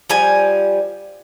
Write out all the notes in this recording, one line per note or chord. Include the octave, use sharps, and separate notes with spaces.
F3 G3 G#5